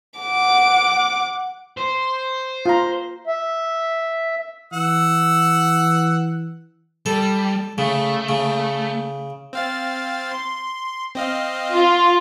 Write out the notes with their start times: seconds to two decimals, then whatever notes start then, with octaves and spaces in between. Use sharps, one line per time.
0.19 F#5 D6
1.77 C5
2.66 F4 A#5
3.27 E5
4.73 E3 F#5 E6
7.06 G3 A4
7.78 C#3 A3
8.29 C#3
9.53 C4 F5 A6
10.31 C6
11.15 C4 D#5 F5
11.72 F4